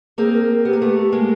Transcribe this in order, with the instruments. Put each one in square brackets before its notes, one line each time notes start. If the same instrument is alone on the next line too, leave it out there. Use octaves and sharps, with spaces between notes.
[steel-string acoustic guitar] A#3 C4 [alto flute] G#4
[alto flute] A#4
[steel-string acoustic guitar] B3 [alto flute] G4
[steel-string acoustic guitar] A#3
A3 B3
G#3 A#3